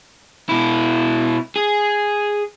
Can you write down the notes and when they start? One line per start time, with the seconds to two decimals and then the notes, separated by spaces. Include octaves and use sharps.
0.49 B2 E4
1.56 G#4